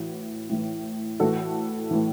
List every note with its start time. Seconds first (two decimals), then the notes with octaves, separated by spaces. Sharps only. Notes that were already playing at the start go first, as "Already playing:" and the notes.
Already playing: A2 E3 F#4
0.50 A2 E3
1.20 A2 E3 F#4 A4
1.91 A2 E3